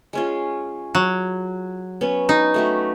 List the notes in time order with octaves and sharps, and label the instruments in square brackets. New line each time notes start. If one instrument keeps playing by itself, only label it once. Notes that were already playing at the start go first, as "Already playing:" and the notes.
[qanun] G#3 C#4 F4
[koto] F#3
[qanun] B3 C#4
[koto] D#4
[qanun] A3 F#4 G4